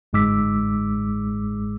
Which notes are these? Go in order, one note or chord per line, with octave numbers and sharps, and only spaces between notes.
G1 G#2 G#3 D6 E6 B6